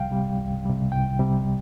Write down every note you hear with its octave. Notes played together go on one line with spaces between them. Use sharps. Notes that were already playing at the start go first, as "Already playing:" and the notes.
Already playing: C2 C3 G3 F5 G5
C3 G3
C2
C3 G3
C2 G5
C3 G3